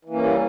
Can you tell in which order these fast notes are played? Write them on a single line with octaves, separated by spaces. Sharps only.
E3 A#3 C#4 G3